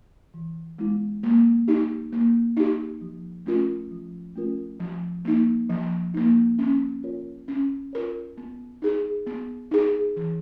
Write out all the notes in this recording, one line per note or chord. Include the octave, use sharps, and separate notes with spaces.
E3
G#3 B3 E4
A#3
D#4 G4
A#3
D#4 G4
F3
A3 C#4 F4 A#4
F3
A3 C#4 F4 A#4
F3
A#3 D#4
F3
A#3 D#4
C#4
F4 A#4 C#5
C#4
F4 A#4 C#5
B3
D#4 G#4
B3
D#4 G#4
E3